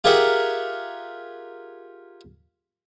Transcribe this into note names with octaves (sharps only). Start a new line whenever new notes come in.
F4 G4 G#4 A#4 E5 F#5